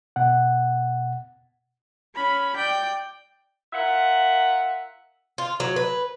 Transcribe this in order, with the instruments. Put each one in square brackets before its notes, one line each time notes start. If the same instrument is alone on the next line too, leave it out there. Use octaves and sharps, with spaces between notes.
[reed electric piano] B2 F#5
[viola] C#4 B5
D5 G5
[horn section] F4 A#4 E5 F#5
[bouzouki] F4
F#3
B4